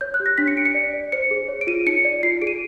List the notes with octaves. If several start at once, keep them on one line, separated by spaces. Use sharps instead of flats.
C#5 G6
F#6
G4
A#6
D4 B6
C#7
D4 D7
C#7
D5
D5
C5 C#7
G#4
C#5
D7
F4 D#7
D#4 C#7
D5
F4 C7
G#4 D7
D#7